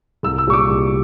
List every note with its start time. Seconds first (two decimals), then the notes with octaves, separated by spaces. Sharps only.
0.23 C2 E6
0.38 E6
0.47 A#2 G3 C#6
0.53 D6
0.69 C2